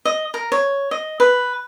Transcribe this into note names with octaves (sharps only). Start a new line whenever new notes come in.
D#5
A#4
C#5
D#5
B4